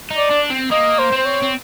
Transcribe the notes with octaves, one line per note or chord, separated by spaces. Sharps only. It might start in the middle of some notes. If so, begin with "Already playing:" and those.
D#4
D5
D4
C4
A#3 D#5
C5
C4
C5
C#5
C4